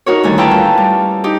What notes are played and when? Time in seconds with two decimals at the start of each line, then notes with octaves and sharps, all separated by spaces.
0.06 D#4 F#4 A#4 C#5
0.23 D2 D#3 G3 G#5
0.38 E4 F4 B4 G5 A5 A#5
0.51 C#4
0.78 G3
1.24 D#4 G4